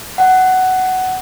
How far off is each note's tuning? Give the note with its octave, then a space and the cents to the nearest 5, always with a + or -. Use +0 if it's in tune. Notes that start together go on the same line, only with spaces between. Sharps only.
F#5 +10